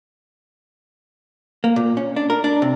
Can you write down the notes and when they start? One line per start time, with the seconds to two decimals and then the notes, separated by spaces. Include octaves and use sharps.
1.64 A#3
1.76 A#2
1.97 C#4
2.16 D4
2.30 A#4
2.44 D4
2.62 C3